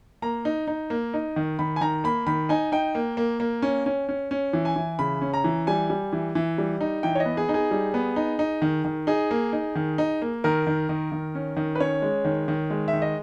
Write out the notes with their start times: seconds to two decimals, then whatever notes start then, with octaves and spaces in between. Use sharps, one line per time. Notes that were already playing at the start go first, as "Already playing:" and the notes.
0.22 A#3 A#5
0.45 D#4
0.68 D#4
0.90 A#3
1.14 D#4
1.36 D#3
1.59 D#3 B5
1.76 G#5
1.81 D#3 A#5
2.04 A#3 B5
2.27 D#3 B5
2.49 D#4 G#5
2.72 D#4 G5
2.95 A#3
3.17 A#3
3.40 A#3
3.62 C#4
3.86 C#4
4.09 C#4
4.31 C#4
4.53 E3
4.65 G#5
4.76 E3
4.99 C#3 B5
5.22 C#4
5.34 A#5
5.44 E3
5.67 G3 G#5
5.90 G3
6.13 E3
6.35 E3
6.58 G3
6.81 D#4
7.03 E3 G5
7.15 C#5
7.20 D#5
7.26 B3
7.37 G#4
7.49 D#4
7.54 G#4
7.71 G3
7.94 B3
8.16 D#4
8.39 D#4
8.62 D#3
8.85 D#3
9.07 D#4 G#4
9.31 A#3
9.53 D#4
9.75 D#3
9.98 D#4
10.22 A#3
10.44 D#3 A#4
10.67 D#3
10.89 D#3
11.12 D#3
11.35 C#4
11.57 D#3
11.75 B4
11.80 C#4 C#5
12.02 G#3
12.25 D#3
12.48 D#3
12.70 G#3
12.88 E5
12.93 D#3
13.02 D#5